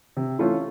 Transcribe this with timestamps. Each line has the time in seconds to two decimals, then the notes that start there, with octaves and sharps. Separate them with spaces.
0.17 C3
0.38 E3 A3 C#4 F4